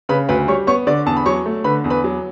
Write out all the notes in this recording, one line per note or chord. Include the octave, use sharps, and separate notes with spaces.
C#3 B4 B5
D2 B4 B5
G3 C#5 C#6
B3 C#5 C#6
D3 D5 D6
E2 A5
B5
F#3 C#5 C#6
A3
D3 B4 B5
E2
B4 B5
F#3